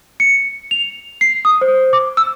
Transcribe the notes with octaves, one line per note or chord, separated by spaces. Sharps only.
C#7
F7
C7
D#6
C5
D6
E6